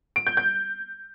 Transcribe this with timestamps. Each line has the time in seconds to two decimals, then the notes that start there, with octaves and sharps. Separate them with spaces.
0.16 D7
0.27 G6
0.37 G6